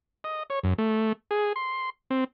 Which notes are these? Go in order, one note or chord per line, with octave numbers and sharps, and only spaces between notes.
D#5
C#5
F#2
A3
G#4
C6
C4